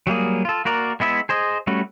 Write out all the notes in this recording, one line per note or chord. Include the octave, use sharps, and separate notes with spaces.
F#3 G3 A#3 G#4
F4 A4
A#3 F#4 A#4 D5
G#3 B3 E4 E5
G#4 C5 D#5
G3 A3 C#4 F#4